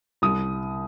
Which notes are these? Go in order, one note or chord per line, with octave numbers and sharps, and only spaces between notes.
C2 D#6